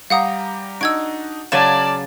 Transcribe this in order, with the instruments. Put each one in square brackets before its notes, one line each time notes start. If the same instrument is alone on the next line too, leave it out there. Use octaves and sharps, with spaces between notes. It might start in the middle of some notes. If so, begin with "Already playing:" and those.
[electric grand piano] G3 G4 A#5 [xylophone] F5 F#5 D#6
[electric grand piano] D4 D#4 D#5 [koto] F#4 [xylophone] E6 G#6 D7
[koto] C#3 F#3 G#5 [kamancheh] D5 A5 [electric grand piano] F5 A6 [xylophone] E7